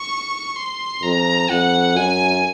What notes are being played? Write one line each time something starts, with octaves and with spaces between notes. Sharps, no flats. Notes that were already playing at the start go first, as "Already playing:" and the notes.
Already playing: C#6
C6
F2 A#5
F2 F#5
F#2 G#5